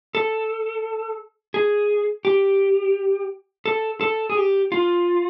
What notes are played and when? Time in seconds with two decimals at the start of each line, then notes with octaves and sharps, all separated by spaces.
0.15 A4
1.54 G#4
2.25 G4
3.66 A4
4.01 A4
4.30 G#4
4.37 G4
4.72 F4